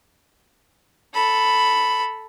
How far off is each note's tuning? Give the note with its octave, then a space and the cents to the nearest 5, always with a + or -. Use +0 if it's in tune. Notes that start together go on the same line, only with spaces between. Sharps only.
A4 +0 B5 +0